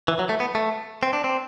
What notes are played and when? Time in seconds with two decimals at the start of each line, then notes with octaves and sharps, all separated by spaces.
0.08 E3
0.19 F#3
0.29 A3
0.40 B3
0.55 A3
1.03 C4
1.13 D4
1.24 C4